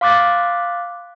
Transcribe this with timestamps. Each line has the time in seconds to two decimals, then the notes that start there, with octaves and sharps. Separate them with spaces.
0.01 F5 C6 D6 F#6 A6